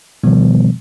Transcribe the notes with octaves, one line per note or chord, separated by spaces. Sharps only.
B2 D#3 F3 G3 B3